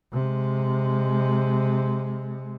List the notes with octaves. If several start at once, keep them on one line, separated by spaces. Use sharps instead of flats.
C3 G#3